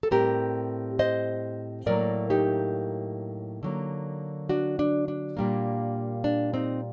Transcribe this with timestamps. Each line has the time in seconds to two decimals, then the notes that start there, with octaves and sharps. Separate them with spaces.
0.03 A4
0.11 A2 G3 C4 G4 A#4
0.99 C5 D#5
1.86 A2 F#3 A#3 A#4 D5
2.30 D#4 G4
3.63 D3 F#3 A#3
4.49 D4 F#4
4.79 D4
5.08 D4
5.37 A#2 G3 A#3
6.24 D4
6.54 C4 D#4